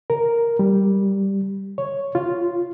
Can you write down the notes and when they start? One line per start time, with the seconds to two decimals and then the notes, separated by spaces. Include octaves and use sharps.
0.10 A#4
0.59 G3
1.78 C#5
2.15 F4